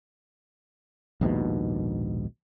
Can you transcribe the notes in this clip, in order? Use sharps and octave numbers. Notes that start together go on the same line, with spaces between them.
A#1 D#2 G#2 B2